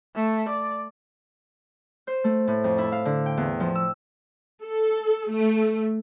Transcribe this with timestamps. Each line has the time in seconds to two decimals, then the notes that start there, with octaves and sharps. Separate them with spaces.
0.15 A3
0.49 D5
2.07 C5
2.24 A3
2.48 A2
2.64 F2
2.78 E4
2.92 F5
3.05 D3
3.26 G5
3.37 E2
3.60 F3
3.75 E6
4.61 A4
5.29 A3